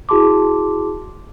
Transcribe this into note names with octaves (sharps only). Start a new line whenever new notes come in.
E4 F#4 G#4 A5 C6 D6